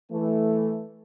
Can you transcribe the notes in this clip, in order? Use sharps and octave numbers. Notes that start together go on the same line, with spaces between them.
E3 A3